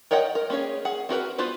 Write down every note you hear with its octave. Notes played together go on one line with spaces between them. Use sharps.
A#4 C#5 D#5 F#5 G5
A#4
A#3 C#4 G#4 C#5
G#4 F#5
C4 F#4 A#4 B4
B3 F4 B4 C5